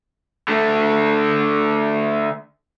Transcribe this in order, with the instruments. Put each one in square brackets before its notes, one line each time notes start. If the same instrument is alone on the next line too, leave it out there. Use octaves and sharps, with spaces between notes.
[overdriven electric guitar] D3 A3